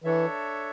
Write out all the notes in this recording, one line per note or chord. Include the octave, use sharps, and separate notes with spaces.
E3 D4 A4 C#5 E5